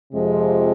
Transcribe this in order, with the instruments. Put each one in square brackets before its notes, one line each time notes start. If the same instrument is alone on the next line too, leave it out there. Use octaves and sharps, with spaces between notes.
[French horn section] F2 C3 F3 G#3